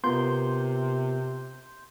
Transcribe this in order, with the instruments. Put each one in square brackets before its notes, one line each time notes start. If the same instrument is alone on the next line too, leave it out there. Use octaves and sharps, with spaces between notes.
[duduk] C3 [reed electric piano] B3 F4 A#4 [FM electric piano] C6 G6